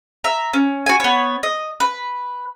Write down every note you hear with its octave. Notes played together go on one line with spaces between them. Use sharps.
E5 A#5
C#4
F#4 G#5
B3 C#5
D#5
B4